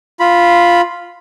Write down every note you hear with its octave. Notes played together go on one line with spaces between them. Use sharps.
F4 B5